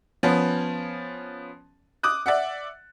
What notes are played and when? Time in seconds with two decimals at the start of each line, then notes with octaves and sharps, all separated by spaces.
0.23 F3 B3 C#4
2.03 D6 D#6 F#6
2.26 D5 E5 F#5